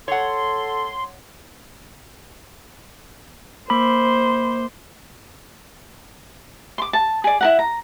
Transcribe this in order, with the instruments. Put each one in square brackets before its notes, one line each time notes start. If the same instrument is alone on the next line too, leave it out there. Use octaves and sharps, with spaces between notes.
[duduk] A4 [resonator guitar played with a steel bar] C#5 F#5 [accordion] C6
[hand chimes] A#3 D6 [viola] C5 [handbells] B5
[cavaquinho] C6 D6
A5
G#4 D5
E4 A#4 F#5
A#5